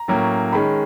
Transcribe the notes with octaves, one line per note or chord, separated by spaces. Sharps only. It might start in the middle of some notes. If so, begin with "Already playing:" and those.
Already playing: A#5
A2 F#3 A#3 C#4
D#3 G#3 C#4 B5